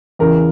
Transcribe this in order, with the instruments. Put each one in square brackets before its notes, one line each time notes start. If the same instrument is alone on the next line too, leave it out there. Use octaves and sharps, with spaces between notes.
[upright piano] E2 C#3 E3 A#4